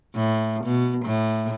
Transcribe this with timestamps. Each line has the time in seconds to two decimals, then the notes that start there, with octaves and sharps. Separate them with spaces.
0.15 A2
0.64 B2
1.06 A2